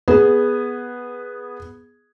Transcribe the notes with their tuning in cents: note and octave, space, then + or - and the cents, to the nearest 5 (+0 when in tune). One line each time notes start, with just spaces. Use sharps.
B3 -5 G#4 +0